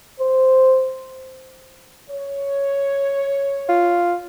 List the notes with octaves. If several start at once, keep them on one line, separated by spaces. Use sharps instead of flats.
C5
C#5
F4